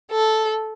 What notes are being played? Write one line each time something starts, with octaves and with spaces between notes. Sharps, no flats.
A4